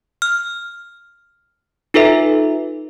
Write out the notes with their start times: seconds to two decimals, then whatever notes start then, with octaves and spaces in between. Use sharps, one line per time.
0.22 F6
1.94 D#4 F4 A4 B4 E5